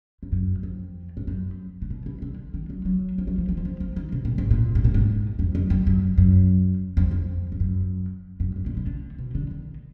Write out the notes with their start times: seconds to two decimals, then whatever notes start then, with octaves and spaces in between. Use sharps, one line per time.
0.23 G#2
0.32 F#2
0.63 F2
1.17 G#2
1.27 F#2
1.82 A#2
1.90 B2
2.06 B2
2.22 D3
2.54 D#3
2.70 F#3
2.85 F#3
3.18 F3
3.27 F#3
3.38 F3
3.49 F3
3.57 D#3
3.65 F3
3.80 F3
3.96 D#3
4.12 B2
4.25 A#2
4.38 G#2
4.51 A#2
4.75 G#2
4.84 A#2
4.94 G#2
5.39 F2
5.55 F#2
5.70 F#2
5.87 F#2
6.18 F#2
6.97 F2
7.11 F2
7.52 G#2
7.60 F#2
8.40 F#2
8.56 G#2
8.66 A#2
8.77 B2
8.87 D3
9.19 B2
9.35 D3
9.51 D#3